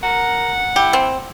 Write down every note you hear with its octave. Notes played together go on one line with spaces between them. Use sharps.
A#4 F#5
E4 G4
C4